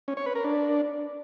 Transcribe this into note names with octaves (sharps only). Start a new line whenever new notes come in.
C#4
C#5
B4
A#4
D4